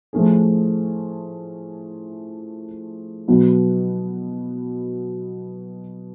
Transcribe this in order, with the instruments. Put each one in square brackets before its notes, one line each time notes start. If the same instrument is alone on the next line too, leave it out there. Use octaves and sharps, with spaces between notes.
[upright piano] A2 F3 A3 C#4 G#4
B2 F#3 B3